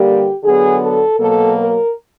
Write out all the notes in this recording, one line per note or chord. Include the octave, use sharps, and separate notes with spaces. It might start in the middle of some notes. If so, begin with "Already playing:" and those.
Already playing: D3 G3 A#3 G4
D3 F#3 B3 G#4
A4
B2 F#3 A#3 A4
A#4